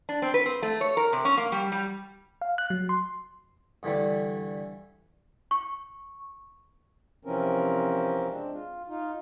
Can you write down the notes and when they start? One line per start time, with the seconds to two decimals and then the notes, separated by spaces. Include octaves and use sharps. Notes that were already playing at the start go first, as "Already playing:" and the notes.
0.09 D4
0.22 C4
0.34 B4
0.46 C4
0.63 A3
0.81 C#5
0.97 A#4
1.13 C3
1.25 C#4
1.37 A#3
1.52 G3
1.72 G3
2.42 F5
2.58 F#6
2.70 F#3
2.89 C6
3.83 G2 D3 E3 G3 A3
5.51 C#6
7.25 C3 E3 F3 C4 C#4 A#4
8.28 G#3 C4 D4
8.53 F4
8.89 D#4 F4